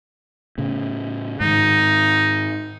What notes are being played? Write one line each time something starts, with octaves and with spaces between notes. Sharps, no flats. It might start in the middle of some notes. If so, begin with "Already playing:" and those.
A2 C#3
G#2 D#3 D#4